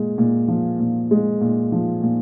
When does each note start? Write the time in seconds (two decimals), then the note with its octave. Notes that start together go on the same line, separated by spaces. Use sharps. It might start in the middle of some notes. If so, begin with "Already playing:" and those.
Already playing: A#2 G#3
0.18 A#2
0.48 F3
0.79 A#2
1.11 G#3
1.41 A#2
1.72 F3
2.03 A#2